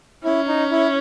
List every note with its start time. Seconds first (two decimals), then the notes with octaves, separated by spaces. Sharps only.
0.24 C#4 E4
0.48 D#4
0.71 E4